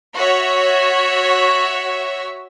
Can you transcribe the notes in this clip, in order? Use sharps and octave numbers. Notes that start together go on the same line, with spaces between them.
F#4 C#5 E5